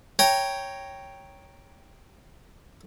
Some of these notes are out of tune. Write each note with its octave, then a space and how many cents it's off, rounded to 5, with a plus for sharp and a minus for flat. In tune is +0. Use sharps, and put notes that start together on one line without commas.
C#5 +0 G5 +0 A#5 +0